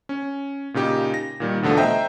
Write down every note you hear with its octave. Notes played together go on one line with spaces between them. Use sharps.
C#4
A#2 C#3 D#4 G4
A#6
A#2 D#3 G3
E2 B2 D3 F3 A3
C5 D#5 E5 G5 A#5